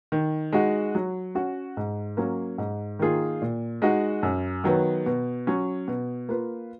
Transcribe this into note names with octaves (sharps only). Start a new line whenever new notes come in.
D#3
G#3 D#4 F#4
F#3
C#4 F#4
G#2
F#3 A#3 C#4
G#2
D#3 A#3 F4 G#4
A#2
G#3 D#4 F#4
F#2
D#3 F#3 B3
B2
F#3 C#4
B2
A#3 F4 B4